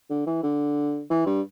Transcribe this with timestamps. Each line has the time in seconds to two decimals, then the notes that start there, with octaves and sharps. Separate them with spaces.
0.10 D3
0.27 E3
0.43 D3
1.10 E3
1.26 G2